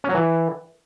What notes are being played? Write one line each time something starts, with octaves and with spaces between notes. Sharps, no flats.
C#4
F#3
E3